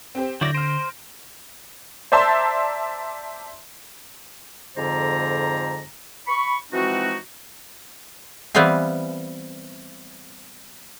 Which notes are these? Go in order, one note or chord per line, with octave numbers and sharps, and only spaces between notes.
C4 G4 C5
D3 F#3 E4 D5 G6 A#6
C5 F6 D7
C5 D5 E5 A5 A#5 C6
F2 G#2 D3 C5 D5 A#5
B5 C#6
E3 F3 G#3 C4 D#4 F#4
E3 G3 B3 C4 F5 G#5